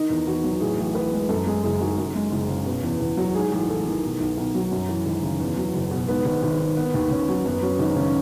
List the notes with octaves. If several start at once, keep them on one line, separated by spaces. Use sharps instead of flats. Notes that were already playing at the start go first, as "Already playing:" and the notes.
Already playing: D#3 D#4
E2
E2 F#4
F#3
A2 G#4
A1
A1 B4
G#3
F#2 A4
G#3 G#4
F#1 G#4
D#3 F#4
F#2
G#3
F#1
C#3
B2
E2
E2
F#3
G#2 G#4
A1
A1 A4
D#3
B2
B1
B1
F#3
F#2
E3
G#1
C#3
E2
F#3
F#1
B2
G#2 B3
G#1
G#1
D#3
D#3 B3
D#2
D#2 C#4
F#3
F#2 B3
F#3 C#4
G#1 D#4
C#3 C#4